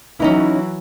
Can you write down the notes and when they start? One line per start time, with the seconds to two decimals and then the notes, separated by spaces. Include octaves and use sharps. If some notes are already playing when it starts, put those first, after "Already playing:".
0.20 E3 F#3 C#4 D#4 E4